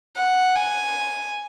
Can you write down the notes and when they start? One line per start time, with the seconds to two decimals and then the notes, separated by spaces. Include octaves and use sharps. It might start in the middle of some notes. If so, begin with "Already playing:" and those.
0.17 F#5
0.55 G#5